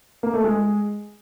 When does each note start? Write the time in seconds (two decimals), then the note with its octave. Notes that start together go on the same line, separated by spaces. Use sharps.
0.23 A#3
0.34 A3
0.44 G#3